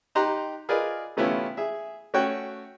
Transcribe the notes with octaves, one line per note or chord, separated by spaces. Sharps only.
D#4 G4 A#5 C6 F#6
F4 G#4 A#4 B4 D5 D#5
C3 A3 B3 C#4 E4 F4
G#4 E5
A3 C#4 F#4 C#5 G5 F#6